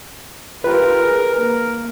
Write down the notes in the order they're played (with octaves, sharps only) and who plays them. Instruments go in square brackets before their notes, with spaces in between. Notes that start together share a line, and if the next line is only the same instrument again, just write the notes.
[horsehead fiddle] F4 G4 [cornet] A#4 [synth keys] B4
[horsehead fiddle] G#4
[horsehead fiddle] A#3 [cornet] A#4